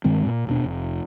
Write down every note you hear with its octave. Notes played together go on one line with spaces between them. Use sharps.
G2 D#3 G#3 C4
A#2
D#1 B2 D4
F1